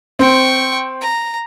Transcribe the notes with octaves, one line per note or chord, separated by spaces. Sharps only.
C4 G5 C#6
A#5